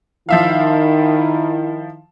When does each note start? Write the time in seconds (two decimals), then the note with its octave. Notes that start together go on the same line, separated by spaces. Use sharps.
0.29 D#3 F3 E4 E5 F5